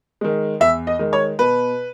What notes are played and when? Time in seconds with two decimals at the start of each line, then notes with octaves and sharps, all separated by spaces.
0.21 D#3 G#3
0.60 E2 E5
0.87 D#5
0.99 D#3 G#3
1.13 C#5
1.39 B2 B4